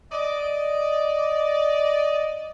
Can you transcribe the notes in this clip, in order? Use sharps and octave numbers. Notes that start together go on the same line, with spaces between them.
D5 D#5